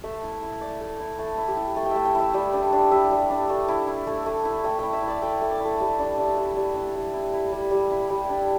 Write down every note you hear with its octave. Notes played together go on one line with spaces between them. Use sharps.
A3 E5
E4
E4
A3 D5
A3
E4
A3 A4
E4
G4
E4
A3 A4
G5
A3 E5
G5
E4 E5
G3 G5
D4
G5
D4
G3 E5
G3
D4
A3
E4
E4
A3
A3
E4
A3 G5
E4 G5
E5
E4
D5
A3 G5
A3
D5
E4
A4
G3
D4
D4
G3 E5
G3
D4
G3
E4
E4
G3
G3
E4
G3 G5
D4